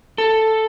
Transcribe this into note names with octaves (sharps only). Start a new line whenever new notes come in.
A4